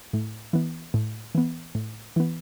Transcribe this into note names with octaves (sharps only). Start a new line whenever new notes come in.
A2
E3 B3
A2
E3 B3
A2
E3 B3